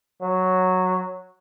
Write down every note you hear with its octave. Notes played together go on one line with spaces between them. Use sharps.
F#3